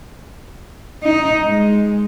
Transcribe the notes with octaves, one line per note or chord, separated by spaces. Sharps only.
D#4
G#3